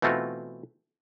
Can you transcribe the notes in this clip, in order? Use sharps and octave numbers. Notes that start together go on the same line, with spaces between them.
B2 E3 A3 C4 F4 F#4